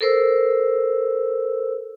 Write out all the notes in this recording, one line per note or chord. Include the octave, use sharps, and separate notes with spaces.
A4 A#4 C5 E6